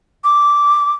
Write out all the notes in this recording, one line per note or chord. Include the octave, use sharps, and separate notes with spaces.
D6